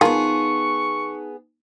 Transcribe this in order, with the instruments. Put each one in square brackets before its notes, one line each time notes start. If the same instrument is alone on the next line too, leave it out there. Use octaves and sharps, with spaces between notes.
[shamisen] D#3 F4 G#5 [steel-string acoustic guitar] B3 G#4 [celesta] D#4 A5 [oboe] C#6